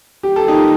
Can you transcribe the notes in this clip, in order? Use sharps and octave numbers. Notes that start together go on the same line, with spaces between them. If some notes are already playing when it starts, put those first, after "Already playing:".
D#3 G3 A#3 F4 G4
A4
D#4 G4